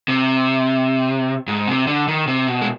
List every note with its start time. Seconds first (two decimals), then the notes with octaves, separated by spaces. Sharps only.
0.08 C3
1.48 G#2
1.68 C3
1.87 D3
2.08 D#3
2.27 C3
2.47 B2
2.62 G#3